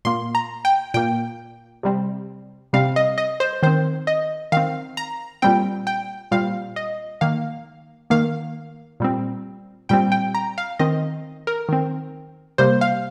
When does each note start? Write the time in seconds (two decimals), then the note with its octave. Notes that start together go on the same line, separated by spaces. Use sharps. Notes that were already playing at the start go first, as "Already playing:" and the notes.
0.05 A#2 A#3 C6
0.35 A#5
0.65 G5
0.94 A#2 A#3 G5
1.83 C3 G3 C4
2.73 C3 G3 C4 F5
2.96 D#5
3.18 D#5
3.40 C5
3.63 D#3 C4 C5
4.07 D#5
4.52 D#3 C4 F5
4.97 A#5
5.42 A#2 G3 C4 G5
5.87 G5
6.31 A#2 G3 C4 F5
6.76 D#5
7.21 D#3 A#3 F5
8.10 D#3 A#3 F5
9.00 A#2 G3 C4
9.89 A#2 G3 C4 G5
10.12 G5
10.35 A#5
10.58 F5
10.79 D#3 C4 D#5
11.47 A#4
11.69 D#3 C4
12.58 C3 G3 A#3 C5
12.81 F5